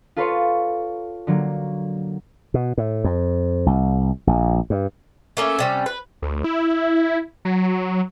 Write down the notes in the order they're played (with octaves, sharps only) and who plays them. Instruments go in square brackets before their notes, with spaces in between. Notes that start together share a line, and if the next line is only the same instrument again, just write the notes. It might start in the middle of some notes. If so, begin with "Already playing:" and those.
[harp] F4 A4 B4 C#5 C6
D3 F#3 A#3
[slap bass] B2
A2
F2
C2
A#1
G2
[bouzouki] A3 A#3 C#4 E5
C3 G3 C#4
B4
[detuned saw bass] D2
E4
F#3